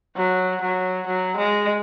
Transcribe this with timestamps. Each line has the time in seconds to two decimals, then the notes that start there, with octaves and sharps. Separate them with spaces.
0.16 F#3
0.61 F#3
1.07 F#3
1.37 G#3